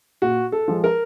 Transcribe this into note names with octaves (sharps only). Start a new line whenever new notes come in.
A#2 F#4
A4
F3 G#3
A#4